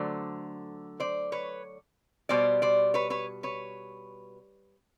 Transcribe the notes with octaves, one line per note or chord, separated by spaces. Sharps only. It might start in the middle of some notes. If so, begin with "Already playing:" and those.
Already playing: D3 F#3 A3 C5 D5
C5 D5
B4 C#5
B2 G3 C5 D5
C5 D5
B4 C#5
B4 C#5
B4 C#5